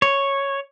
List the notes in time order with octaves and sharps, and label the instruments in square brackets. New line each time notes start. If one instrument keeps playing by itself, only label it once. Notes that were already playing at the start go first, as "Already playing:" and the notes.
[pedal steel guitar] C#5